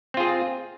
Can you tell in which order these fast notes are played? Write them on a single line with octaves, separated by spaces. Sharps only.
C4 F4 G#4